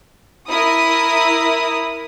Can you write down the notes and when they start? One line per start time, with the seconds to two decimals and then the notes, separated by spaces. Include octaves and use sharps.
0.48 E4 A#4 D#6